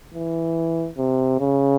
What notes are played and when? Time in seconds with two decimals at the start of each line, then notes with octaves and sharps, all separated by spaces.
0.14 E3
0.98 C3
1.40 C#3